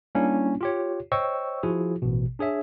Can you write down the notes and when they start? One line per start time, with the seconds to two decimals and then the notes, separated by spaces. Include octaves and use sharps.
0.15 G3 A#3 C#4 D4 E4
0.61 F4 G4 C#5
1.12 C5 C#5 D#5 G5 C#6 E6
1.63 F3 E4 F#4 G#4
2.02 A1 B2
2.39 D4 G#4 C#5 E5